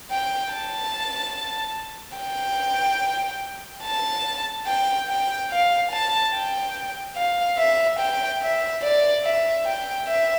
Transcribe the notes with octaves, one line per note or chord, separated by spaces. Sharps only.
G5
A5
G5
A5
G5
G5
F5
A5
G5
F5
E5
G5
E5
D5
E5
G5
E5